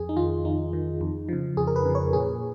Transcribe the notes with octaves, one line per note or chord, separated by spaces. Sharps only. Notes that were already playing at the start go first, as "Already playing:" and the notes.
Already playing: F2 G#4
D#4
D#3 F4
F2 D#4
D#3
F2
C#3 F3
F2 G#4
A#4
B4
C#3 F3
C#5
A#2 G#4